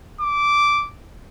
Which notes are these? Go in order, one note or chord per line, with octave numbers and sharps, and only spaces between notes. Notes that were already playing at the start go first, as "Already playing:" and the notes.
D6